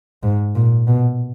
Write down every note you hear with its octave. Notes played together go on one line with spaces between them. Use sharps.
G#2
A#2
B2